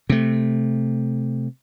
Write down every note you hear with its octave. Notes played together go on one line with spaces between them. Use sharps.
C3 A3